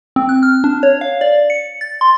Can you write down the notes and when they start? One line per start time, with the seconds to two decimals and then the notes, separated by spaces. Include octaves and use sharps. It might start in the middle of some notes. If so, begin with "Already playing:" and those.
0.16 C4
0.29 F#6
0.43 F6
0.64 D4
0.83 C#5
1.01 F5
1.21 D5
1.50 C#7
1.81 A6
2.01 C6